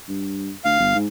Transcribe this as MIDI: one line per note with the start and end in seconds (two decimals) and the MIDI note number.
0.08 0.52 43
0.65 0.79 38
0.65 0.97 77
0.80 0.94 31
0.95 1.07 44